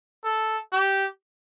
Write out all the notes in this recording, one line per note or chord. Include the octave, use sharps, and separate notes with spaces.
A4
G4